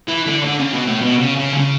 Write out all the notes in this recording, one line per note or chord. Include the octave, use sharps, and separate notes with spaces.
E3
D3
D3
C#3
B2
A2
B2
C#3
C#3
D3
C#3